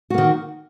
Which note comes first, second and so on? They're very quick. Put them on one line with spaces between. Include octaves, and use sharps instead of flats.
F#4 A#3 D#3